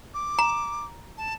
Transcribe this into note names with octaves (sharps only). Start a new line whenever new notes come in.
D6
A#5
A5